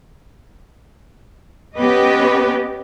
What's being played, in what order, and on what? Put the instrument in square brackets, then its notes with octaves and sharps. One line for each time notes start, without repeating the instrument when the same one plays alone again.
[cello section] B3 C#4 G4 B4 D#5